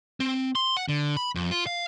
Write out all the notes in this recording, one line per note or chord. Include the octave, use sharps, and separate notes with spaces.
C4
C6
F#5
D3
B5
F2
F4
F5